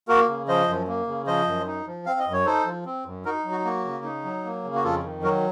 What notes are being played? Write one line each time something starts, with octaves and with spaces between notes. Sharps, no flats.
A#3 F#4 A#4
C#3
F3 C5 D#5
F#2
A#3
C#3
F3 C5 D#5
F#2
D#4
F3
C4 F5
D#5
F#2
C#5
D#4 A4 C5
F3
C4
F#2
D#4 F#4 A#4
F#3
F#4
A#3 F#4
C#3
D#4
F#3
A#3
C#3
F#4
F2 F4 A4
D#3
F#3 F#4 A#4